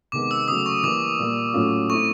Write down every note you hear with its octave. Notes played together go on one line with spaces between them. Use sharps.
C3 D#3 G#3 B3 D#4 D6
E6
C#3 F#3 A3 D#6
C#6
E3 G3 A#3 D6
A#2 G3 A#3
A2 F#3 A3 C#4 F4
A3 C4 E4 C#6